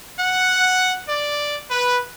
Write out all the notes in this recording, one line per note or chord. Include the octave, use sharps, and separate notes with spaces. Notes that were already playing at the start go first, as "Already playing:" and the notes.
F#5
D5
B4